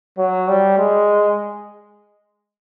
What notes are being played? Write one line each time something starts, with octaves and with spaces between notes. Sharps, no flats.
F#3
G3
G#3